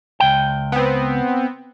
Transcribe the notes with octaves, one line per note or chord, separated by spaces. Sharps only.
C#2 G5
B3 C4